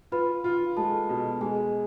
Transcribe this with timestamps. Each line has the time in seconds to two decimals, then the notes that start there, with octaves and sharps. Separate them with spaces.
0.12 F4 B4 B5
0.44 F4
0.77 G#3 A4 A5
1.09 B2
1.41 G#3 G#4 G#5